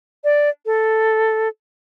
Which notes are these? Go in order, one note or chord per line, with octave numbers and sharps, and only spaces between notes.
D5
A4